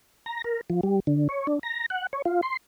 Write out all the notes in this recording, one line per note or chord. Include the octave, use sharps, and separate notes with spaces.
A#5
A#4
F3
G3
D3
C#5
D4
A#5
F#5
C#5
F4
C6